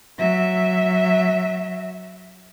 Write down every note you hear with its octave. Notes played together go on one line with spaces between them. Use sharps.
F#3 E5